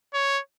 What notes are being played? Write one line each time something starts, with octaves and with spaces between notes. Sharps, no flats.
C#5